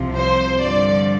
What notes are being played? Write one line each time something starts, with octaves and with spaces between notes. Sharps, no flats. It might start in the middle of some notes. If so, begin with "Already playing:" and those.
Already playing: C2 C3 F3
C5
G2 D3 F3 D5